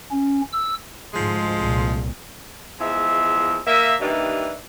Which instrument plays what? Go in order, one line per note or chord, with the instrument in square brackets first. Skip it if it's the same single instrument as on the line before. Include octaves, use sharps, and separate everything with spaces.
[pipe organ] C#4
E6
[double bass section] D2 G#2 [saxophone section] F3 G#3
[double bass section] C2 A#2
[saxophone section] E2 F3 G#3 E5
A#3 E5
D#2 E3 G3 D4 D#4